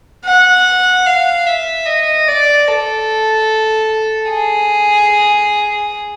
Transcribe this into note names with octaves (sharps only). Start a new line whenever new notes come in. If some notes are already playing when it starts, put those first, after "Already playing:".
F#5
F5
E5
D#5
D5
A4
G#4